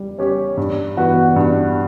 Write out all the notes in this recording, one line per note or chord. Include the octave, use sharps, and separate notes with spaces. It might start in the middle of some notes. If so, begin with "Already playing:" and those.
Already playing: G3
C#4 G4 C#5
G2
E3 B3 F#4 B4
G2